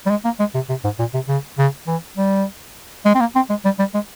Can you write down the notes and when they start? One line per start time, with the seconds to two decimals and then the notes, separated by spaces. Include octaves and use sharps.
0.06 G3
0.10 G#3
0.25 A#3
0.39 G#3
0.55 C3
0.69 C3
0.84 G#2
0.99 A#2
1.14 C3
1.28 C#3
1.58 C#3
1.87 E3
2.17 G3
3.05 G#3
3.15 C4
3.20 A#3
3.36 C4
3.50 G#3
3.65 G3
3.79 G3
3.94 G#3